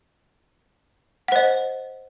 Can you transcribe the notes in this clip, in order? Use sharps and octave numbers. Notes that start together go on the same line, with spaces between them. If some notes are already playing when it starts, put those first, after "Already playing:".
C5 D#5 F#5